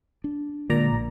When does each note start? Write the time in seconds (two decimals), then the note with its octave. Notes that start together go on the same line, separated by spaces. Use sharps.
0.24 D4
0.70 A#2 D3 G#3 D5 A#5
0.93 A#1